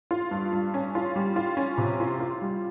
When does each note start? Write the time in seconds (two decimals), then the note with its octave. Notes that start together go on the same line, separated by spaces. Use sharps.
0.11 F4
0.31 G2
0.53 G2
0.74 C#4
0.95 F4
1.16 G3
1.36 F4
1.57 C#4
1.78 C3
2.00 F4
2.20 F4
2.42 G3